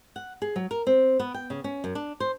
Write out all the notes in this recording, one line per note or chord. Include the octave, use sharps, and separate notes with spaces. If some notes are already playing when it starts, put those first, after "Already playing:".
F#5
G#4
F#3
A#4
C4
B3
G5
C#3
C#4
F#2
D4
C5